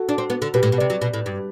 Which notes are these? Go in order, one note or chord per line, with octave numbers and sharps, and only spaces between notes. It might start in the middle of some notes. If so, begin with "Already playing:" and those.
Already playing: F#4 A4
D4
C4
B3
D3
B2 G4 B4
A2
B2
C3 B4 D5
F#3
B2
A2
G2